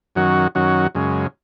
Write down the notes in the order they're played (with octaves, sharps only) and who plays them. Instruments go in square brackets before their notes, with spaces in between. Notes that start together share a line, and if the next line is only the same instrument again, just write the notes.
[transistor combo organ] F#2 D#3 F#3 C#4 F#4
F#2 D#3 F#3 C#4 F#4
F#2 C#3 G#3